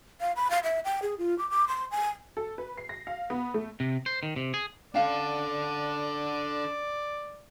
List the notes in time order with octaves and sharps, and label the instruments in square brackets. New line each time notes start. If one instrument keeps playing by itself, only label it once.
[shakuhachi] F5
B5
F5
E5
G5
G#4
F4
D6
D6
C6
G#5
[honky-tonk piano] A4
B4
C7
A#6
F5
B3
A3
[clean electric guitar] C3
C5
D#3
C3
G#4
[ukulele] C#4 F5 G5 [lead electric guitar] D4 A4 [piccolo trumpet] D5